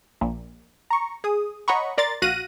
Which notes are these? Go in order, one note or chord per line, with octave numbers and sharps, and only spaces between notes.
A#1 A#2
A#5 C#6
G#4 D#6
C#5 D#5 F#5 A#5 B5 C#6
A#4 D5 A#5 C6 A6
A#1 F#4 F5 F#6 A#6 D#7